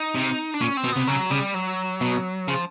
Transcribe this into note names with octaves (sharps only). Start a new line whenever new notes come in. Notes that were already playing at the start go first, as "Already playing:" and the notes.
Already playing: D#4
C3
D4
A#2 C#4
C4
B2
C3 B3
C#3 F#3
C#3 G3
F#3
B2
C#3 F3